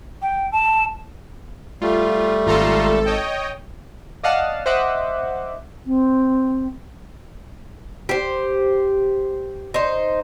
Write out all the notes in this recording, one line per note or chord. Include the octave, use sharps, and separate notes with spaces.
G5
A5
G3 A3 F4
G#1 F4 A4 A#5 C6
C#5 D#5 G5
D5 D#5 F5 F#5 A5
C5 D#5 E5 F#5 D6
C4
G4 C5
D#4 C5